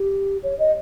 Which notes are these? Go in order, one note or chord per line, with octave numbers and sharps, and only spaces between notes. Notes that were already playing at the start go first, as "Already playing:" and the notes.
Already playing: G4
C#5
D#5